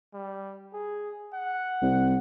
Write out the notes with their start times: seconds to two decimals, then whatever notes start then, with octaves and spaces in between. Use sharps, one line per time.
0.14 G3
0.73 G#4
1.34 F#5
1.82 C2